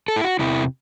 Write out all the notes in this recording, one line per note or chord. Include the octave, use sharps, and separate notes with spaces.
A4
E4
F#4
E2 C3 E3 E4